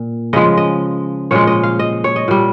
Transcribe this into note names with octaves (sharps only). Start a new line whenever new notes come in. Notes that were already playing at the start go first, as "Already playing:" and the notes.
Already playing: A#2
C#3 F3 G#3 D#5
D#5
A#2 F3 G#3 C#5
D#5
F5
D#5
C#5
D#5
A#2 G3